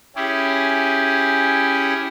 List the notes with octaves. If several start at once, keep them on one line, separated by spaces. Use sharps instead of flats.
C#4 E4 G4 G#4